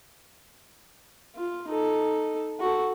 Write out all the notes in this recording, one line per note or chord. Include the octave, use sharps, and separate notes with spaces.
F4
D#4 A4
F#4 A4